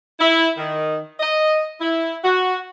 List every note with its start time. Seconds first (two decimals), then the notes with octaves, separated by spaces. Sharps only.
0.20 E4
0.57 D#3
1.20 D#5
1.81 E4
2.23 F#4